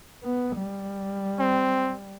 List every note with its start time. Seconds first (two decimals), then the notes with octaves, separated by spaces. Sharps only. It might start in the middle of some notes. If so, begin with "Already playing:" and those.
0.23 B3
0.57 G3
1.39 C4